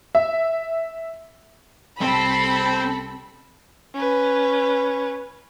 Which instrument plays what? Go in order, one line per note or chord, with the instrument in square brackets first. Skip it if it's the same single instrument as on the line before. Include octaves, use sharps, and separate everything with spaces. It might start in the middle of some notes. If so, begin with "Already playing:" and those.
[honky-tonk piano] E5
[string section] C2 A4 B5 [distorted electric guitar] C4
[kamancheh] C#4 B4